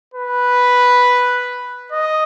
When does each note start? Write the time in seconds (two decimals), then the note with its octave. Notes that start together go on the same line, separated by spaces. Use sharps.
0.14 B4
1.92 D#5